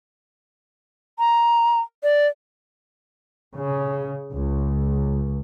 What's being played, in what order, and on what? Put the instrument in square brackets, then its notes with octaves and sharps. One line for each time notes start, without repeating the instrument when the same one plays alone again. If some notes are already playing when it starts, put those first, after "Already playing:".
[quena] A#5
D5
[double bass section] C#3
C#2